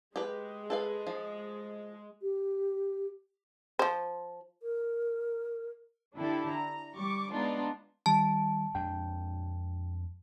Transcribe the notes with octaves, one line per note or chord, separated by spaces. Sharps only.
G#3 G4 B4
A4 B4 F5
F3
G4
F3 C5
A#4
D3 D4 E4 G4 A4
A#5
G3 C#6 D6
G#3 B3 D4 D#4 F4
D#3 G3 A5
F2 G#3 D4 G5